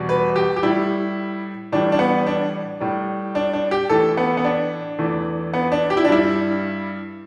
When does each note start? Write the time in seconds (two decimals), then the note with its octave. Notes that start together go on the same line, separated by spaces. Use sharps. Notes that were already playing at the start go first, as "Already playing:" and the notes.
Already playing: E2 B2 G3
0.09 B4
0.36 G4
0.56 G4
0.63 A2 G3 E4
1.72 A2 E3 G3 D4
1.92 D4
1.99 B3
2.27 D4
2.80 A2 G3
3.35 D4
3.53 D4
3.71 G4
3.89 A2 E3 A3 A4
4.17 B3
4.37 B3
4.44 D4
4.99 E2 E3 A3
5.54 B3
5.72 D4
5.90 G4
5.97 E4
6.04 D4
6.08 G2 G3 E4